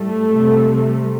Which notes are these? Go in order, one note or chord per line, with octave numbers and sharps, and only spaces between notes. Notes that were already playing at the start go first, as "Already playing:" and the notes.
Already playing: A2 G3 A3
C3 G3